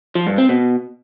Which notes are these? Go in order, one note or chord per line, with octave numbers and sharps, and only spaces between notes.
F3
G2
C4
B2